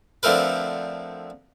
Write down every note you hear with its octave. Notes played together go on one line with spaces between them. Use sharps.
D3 F3 A3 C4 A#4 B4